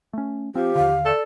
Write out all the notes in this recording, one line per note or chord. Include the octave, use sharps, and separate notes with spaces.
A3 C#4
F3 C4 G4
D#2 D3 F5
A4 D5